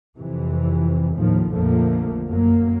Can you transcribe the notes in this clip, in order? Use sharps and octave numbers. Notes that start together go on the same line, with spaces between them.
F2 C3 E3
D#2 A2 D#3 F3
A#1 F2 D3 F3 A3 A#3
F#2 F#3 A#3